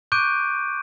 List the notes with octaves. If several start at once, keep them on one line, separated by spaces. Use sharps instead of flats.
C#6 D6 F#6 G6 D7 D#7